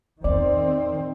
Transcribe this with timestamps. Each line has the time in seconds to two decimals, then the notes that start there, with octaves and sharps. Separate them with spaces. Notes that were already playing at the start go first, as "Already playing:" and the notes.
0.24 E2 D#3 C4 D5